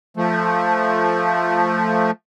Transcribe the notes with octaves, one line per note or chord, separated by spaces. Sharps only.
F3 A3